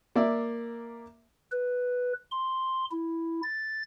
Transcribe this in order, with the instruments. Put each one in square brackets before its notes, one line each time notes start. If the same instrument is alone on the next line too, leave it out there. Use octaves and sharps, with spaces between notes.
[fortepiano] A#3 D5 E5
[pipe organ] B4
C6
E4
A6